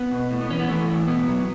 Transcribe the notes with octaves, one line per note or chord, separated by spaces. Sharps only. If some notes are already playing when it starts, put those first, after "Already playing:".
Already playing: B3
B2
A2
B3
E3 C#4
B3
E3 A3
A2
B2 B3
F#3